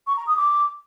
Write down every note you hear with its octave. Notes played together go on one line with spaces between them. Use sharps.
C#6
A#5
D#6
D6